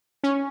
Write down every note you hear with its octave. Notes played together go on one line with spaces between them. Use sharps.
C#4